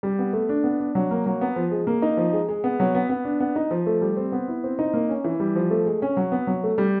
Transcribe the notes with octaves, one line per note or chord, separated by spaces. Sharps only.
G3
B3
A3
D4
B3
D4
F#3
A#3
F#3
B3
F3
G#3
A#3
D#4
F3
G#3
G#3
B3
F#3
B3
B3
D4
B3
D#4
F3
A3
G3
C4
B3
E4
C4
D#4
A#3
C#4
E3
G3
F3
A3
G#3
C#4
F#3
B3
F#3
A3
G3